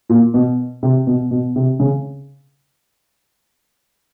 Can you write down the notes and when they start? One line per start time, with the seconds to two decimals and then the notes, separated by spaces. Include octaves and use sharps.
0.09 A#2
0.34 B2
0.83 C3
1.07 B2
1.31 B2
1.56 C3
1.79 C#3